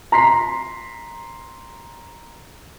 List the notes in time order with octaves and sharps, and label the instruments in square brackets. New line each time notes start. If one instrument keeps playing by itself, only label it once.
[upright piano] A#5 C6 B6 C7